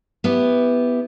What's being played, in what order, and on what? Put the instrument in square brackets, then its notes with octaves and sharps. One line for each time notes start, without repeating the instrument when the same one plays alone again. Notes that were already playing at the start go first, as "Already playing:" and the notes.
[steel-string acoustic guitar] B3 E4 G4